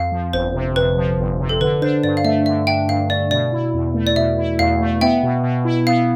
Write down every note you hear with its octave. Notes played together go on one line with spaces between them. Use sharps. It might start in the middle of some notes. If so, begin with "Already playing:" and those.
Already playing: F2 F5
F3
G1 C5
C3
F2 B4
F3
G1
C3
A4
D3 B4
D4 C5
G2 D5
F5
A3 E5
D3 E5
D4 E5 G5
G2 F5
A3 D5
B2 D5
E4
E2
A3
D5
B2 E5
E4
E2 F5
A3
B3 E5 G5
B2
B2
E4
B3 F5